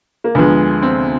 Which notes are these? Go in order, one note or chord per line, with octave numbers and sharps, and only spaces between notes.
A#3
D2 D3 F3 G#3 B3
C4